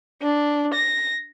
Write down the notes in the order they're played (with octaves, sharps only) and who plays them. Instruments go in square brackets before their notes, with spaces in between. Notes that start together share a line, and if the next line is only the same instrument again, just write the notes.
[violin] D4
A#6